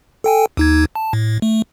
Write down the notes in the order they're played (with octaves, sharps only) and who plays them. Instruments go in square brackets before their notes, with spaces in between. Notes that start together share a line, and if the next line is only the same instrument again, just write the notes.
[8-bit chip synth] A4 G5 G#5
D#2 D#4 G#6
A5
A2
A3